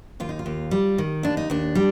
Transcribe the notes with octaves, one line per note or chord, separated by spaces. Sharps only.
D#2 F4
D#4
F4
D#2
G3
D#3
D#2 D4
D#4
D#2 D4
G3